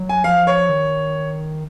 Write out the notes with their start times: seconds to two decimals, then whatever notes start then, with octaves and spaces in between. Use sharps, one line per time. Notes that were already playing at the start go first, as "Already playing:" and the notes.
Already playing: F#3
0.09 G#5
0.24 F3 F5
0.47 C#5
0.69 D#3